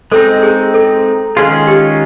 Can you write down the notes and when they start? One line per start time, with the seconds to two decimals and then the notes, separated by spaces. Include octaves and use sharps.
0.12 G#3 C4 D#4 A4
0.43 G#4
0.74 A4
1.36 D#3 G#3 C#4 F4 G#4
1.67 G4